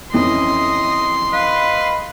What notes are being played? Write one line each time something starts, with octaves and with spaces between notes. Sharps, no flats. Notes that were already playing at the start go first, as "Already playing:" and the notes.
F2 E3 C#4 D#5 C6
B4 D#5 F5 B5